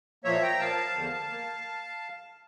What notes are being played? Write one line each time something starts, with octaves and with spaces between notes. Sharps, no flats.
A#2 F3 A#3 C#5 E5
G5 A#5
A#2 F3 A#3 F5 A5
E2 D3 F3 A#3
A#3